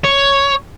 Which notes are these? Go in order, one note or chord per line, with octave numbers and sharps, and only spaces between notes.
C#5